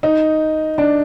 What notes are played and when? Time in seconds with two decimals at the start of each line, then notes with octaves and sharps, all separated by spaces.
0.03 D#4
0.78 D4